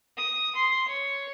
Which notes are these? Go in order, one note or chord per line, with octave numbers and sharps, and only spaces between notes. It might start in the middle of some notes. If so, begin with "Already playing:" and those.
D#6
C6
C#5